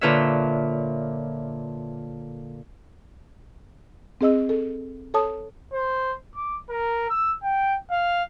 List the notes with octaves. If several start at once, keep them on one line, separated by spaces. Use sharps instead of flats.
A#2 D3 F4 B4 C#5 E5
C4 G#4 D#5 E6
A4
A4 C#5 A5 D#6
C5
D6
A#4
E6
G5
F5